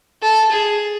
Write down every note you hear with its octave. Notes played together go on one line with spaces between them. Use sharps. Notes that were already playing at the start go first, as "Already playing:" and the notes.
A4
G#4